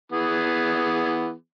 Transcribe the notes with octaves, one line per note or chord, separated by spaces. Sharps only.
E3 B3 G#4